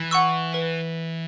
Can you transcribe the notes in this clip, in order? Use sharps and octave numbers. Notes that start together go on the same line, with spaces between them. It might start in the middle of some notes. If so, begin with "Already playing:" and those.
Already playing: E3
F#5 C#6 E6
B4